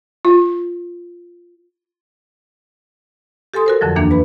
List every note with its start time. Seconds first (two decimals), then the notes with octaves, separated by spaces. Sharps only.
0.25 F4
3.54 G4 A4 G#5 C6 D#6
3.66 F#4 A#4 C5
3.81 F2 D3 F3 F#3
3.96 D#2 E3 A#3 D4
4.11 B4 B5